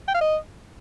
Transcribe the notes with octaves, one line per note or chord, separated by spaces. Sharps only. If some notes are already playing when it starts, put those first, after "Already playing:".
G5
F5
D#5